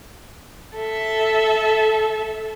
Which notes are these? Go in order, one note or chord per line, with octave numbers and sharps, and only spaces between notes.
A4 E5